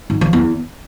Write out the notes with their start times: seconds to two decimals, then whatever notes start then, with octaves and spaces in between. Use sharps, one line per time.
0.10 G#2
0.21 F3
0.33 E2